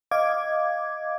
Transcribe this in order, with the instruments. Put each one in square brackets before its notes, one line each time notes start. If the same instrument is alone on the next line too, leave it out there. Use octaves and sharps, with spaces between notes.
[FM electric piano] D#5 F5 D6 G#6